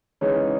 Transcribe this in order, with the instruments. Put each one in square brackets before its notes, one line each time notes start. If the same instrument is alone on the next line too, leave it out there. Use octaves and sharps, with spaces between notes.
[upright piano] C#3 E3 G#3 D#4 [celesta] C#5